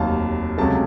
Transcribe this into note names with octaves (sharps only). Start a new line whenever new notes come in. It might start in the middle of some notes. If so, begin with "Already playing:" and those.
Already playing: F1 D#2 D#3 F#3 F5 A5
C#2 C3 F#3 A3 A5